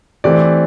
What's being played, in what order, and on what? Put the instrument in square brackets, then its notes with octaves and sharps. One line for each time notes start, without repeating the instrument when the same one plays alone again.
[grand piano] E3 A3 C4 G4 D5